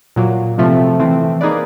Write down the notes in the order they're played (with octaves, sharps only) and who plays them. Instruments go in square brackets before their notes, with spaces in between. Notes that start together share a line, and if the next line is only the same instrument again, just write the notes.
[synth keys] A#2 F#3 A#3
C3 F3 A3 C4
E3 A3 C4
A#3 D#4 G#4 B4 D5